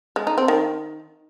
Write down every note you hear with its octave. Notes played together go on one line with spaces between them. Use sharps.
G#3
D#4
C4
D#3